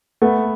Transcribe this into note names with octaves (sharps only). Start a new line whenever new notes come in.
A3 B3